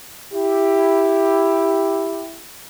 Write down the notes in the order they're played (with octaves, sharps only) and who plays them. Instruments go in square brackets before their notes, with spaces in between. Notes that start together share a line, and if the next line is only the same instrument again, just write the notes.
[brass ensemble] E4 G4